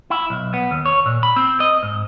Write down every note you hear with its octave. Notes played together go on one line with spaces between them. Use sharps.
E4
B1
B3
D#2
C#5
A#2
B5
C4
D#5
G#2